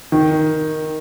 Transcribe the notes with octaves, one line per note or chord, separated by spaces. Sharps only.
D#3